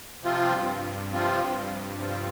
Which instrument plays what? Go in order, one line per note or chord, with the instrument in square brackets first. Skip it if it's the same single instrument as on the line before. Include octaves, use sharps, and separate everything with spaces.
[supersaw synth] G2 [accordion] C3 F3 C4 F4
[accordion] C3 F3 C4 F4
[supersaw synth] G2 [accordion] C3 F3 C4 F4